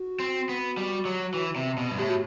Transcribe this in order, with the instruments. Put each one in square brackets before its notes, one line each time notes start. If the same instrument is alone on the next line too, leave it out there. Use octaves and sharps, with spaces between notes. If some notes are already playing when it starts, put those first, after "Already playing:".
Already playing: [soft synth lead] F#4
[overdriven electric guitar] C4
B3
G3
F#3
E3
C3
B2
G2
[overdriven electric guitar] A2 [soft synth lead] G4
[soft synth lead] F#4